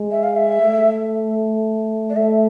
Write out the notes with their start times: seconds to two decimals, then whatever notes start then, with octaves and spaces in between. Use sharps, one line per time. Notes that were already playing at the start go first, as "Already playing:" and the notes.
Already playing: G#3
0.11 E5
0.23 F5
0.36 E5
0.62 A3
2.09 D5
2.15 A3 E5